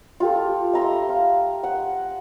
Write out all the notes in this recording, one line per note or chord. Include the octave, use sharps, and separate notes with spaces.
F4 G4 A4
E5 A#5 C6
F5
F#5